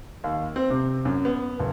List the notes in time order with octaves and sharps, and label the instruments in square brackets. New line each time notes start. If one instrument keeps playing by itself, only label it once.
[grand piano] D#2
C4
C3
F#2
B3
F#1